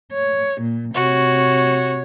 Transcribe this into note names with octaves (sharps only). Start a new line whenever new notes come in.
C#5
A#2
C3 F#4 C#5